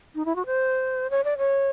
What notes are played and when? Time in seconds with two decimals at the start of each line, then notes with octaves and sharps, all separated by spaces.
0.15 D#4
0.25 E4
0.36 F#4
0.46 C5
1.10 C#5
1.24 D5
1.38 C#5